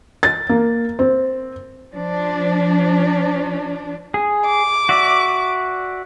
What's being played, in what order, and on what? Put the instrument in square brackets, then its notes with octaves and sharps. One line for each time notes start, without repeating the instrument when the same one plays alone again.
[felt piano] A6
A#3
C4
[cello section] F3 D4
[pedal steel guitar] G#4
[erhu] D6
[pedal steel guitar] F#4 D5 E5